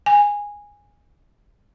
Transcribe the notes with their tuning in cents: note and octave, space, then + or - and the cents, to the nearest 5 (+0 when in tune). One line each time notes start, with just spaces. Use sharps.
G#5 -10